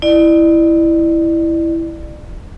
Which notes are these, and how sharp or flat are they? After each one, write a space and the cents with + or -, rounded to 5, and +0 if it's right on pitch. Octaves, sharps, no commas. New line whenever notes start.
E4 +0 D5 +35